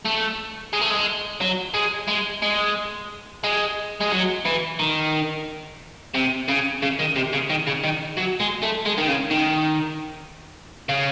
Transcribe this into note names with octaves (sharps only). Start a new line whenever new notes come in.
A3
G#3
A3
G#3
F#3
G#3
G#3
G#3
G#3
G#3
F#3
E3
D#3
C3
C#3
C#3
D#3
C3
C#3
D#3
C#3
D#3
F#3
G#3
A3
G#3
D#3
C#3
D#3
C#3